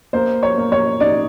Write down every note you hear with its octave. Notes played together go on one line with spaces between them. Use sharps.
A#3 C5
C#5
A#3
C#5
D#4 D5